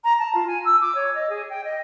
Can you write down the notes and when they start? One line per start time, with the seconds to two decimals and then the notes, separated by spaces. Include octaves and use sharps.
0.04 A#5
0.19 A5
0.35 F4
0.47 G#5
0.65 E6
0.81 D6
0.95 C#5
1.15 D#5
1.30 G#4
1.50 G5
1.64 D#5